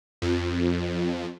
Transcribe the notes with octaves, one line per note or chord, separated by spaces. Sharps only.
F2